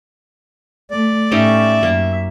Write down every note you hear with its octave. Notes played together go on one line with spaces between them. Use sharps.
A3 D5
A2 C#4 D#4 G4 E5
F#2 A#3